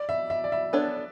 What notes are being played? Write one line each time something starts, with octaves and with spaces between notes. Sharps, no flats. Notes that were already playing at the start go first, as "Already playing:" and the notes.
Already playing: D5
E5
E5
D5
E5
B3 D4 A4 C#5